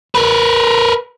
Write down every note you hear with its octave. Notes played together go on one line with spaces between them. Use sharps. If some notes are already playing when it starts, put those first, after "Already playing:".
A#4 B4